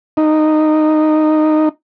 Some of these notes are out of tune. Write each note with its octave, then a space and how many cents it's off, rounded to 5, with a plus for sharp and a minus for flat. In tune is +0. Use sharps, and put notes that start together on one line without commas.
D#4 -10